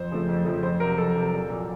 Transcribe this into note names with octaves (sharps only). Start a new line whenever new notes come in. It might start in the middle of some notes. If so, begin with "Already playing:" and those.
Already playing: F2 C5
C#3 F3 A3
F2
C#3 F3 A3
F2 C5
C3 F#3 A#4
F2 A4
C3 F#3
A#1
A#2 F#3 A#3